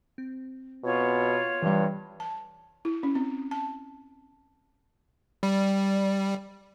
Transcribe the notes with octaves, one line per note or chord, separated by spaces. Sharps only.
C4
B2 F4 C#5
G2 E3 G3
A5
E4
C#4
C4
A5
G3